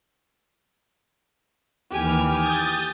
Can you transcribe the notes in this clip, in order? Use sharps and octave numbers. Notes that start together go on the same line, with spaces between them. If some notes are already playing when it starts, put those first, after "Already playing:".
D#2 E3 G4 G#5 F6
D#6 G6 A6